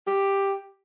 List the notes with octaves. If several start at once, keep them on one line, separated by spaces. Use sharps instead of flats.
G4